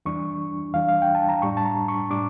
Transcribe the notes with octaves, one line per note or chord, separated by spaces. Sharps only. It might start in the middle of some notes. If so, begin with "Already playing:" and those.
E2 E3 G3 D4 C#6
E2 E3 G3 D4 F5
F5
G5
A5
A#5
A2 G3 D4 C#6
A5
A#5
C#6
A2 G3 D4 D6